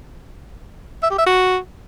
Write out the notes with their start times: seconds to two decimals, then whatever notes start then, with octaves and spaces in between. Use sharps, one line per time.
1.03 E5
1.11 G4
1.18 E5
1.26 F#4